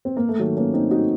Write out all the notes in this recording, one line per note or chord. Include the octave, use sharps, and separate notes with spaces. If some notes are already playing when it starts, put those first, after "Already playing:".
C4
A#3
A3
D#3 F#3
A#3 C#4
C4 D#4
D#4 F#4